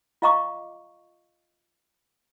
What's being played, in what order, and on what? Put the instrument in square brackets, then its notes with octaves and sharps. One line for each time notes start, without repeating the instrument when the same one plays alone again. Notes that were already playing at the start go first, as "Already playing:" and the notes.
[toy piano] F4 D#5 F5 A#5 C#6 D6